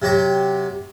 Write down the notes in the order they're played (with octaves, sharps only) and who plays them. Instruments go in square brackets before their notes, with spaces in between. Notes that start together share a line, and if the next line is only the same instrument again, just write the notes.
[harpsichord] C3 F#3 G4 A#5